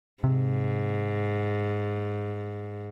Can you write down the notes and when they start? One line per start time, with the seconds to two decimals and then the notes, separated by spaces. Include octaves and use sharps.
0.24 G#2 C3